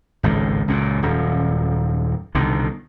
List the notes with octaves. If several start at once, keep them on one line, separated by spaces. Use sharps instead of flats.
G#1 C#2 A2
C#2 F#2 A#2
D#1 F#2
C2 B2 D3 D#3